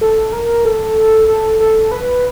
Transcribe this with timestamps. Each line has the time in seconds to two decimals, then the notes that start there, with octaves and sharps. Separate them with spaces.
0.01 A4
0.33 A#4
0.65 A4
1.28 A4
1.60 A4
1.91 B4